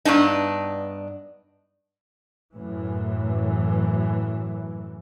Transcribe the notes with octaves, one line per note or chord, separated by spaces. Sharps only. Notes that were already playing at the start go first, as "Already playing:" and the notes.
G2 B3 D4 D#4
F#2 A2 E3